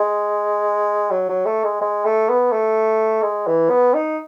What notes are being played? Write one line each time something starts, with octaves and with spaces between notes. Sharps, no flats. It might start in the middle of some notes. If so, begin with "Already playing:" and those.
Already playing: G#3
F#3
F#3
A3
G#3
G#3
A3
B3
A3
G#3
E3
B3
D#4